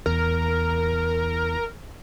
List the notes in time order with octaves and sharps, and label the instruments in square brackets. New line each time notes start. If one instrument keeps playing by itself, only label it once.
[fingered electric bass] E2 [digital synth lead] A#4